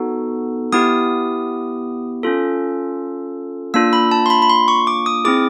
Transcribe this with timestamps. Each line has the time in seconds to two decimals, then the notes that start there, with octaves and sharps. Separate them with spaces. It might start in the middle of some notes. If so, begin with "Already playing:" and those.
Already playing: B3 D#4 F#4 A4
0.72 B3 E4 G4 D#6
2.23 C#4 F4 A4
3.74 A#3 D4 F4 E6
3.93 B5
4.11 A5
4.26 C6
4.30 B5
4.42 B5
4.50 C6
4.68 C#6
4.87 D6
5.06 D#6
5.25 C4 E4 G#4 D6